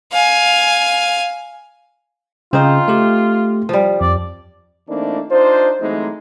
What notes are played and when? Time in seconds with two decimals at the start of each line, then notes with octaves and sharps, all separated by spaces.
0.12 F5 G#5
2.53 C#3 C4 D#4 F4 C5
2.88 A3 G4
3.69 F3 G3
4.01 F2 D5
4.88 E3 A3 A#3 C4 D4 D#4
5.30 D4 D#4 F4 C5
5.81 E3 F#3 G#3 A3 C4 D#4